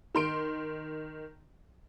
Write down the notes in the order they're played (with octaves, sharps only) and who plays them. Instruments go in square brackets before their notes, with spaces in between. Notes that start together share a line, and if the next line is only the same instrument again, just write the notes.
[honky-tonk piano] D#3 C6 D7